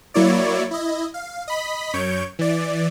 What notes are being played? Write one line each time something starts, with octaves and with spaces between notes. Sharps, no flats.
F#3 A#3 E4 C#5 D5
E4 D#5
F5
D#5 B5 B6
F#2 C#5 C#6 G6 D7
E3 D5